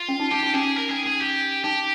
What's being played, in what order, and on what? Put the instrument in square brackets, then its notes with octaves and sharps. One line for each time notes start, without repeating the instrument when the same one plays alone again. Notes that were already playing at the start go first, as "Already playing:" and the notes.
Already playing: [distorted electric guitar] F4
[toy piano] C#4
D#4
[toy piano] D#4 [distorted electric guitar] G4
[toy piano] D#4
[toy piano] C#4 [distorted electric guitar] G#4
[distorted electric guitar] A#4
G#4
G#4
G4
[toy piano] D#4 [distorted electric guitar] G4